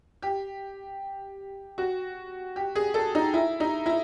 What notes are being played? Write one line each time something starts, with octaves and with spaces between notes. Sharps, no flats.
G4
F#4
G4
G#4
A4
D#4
E4
D#4
E4